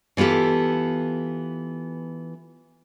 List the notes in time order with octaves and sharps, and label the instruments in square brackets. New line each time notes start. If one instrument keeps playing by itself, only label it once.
[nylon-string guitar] E3 B3 F4 G4 A4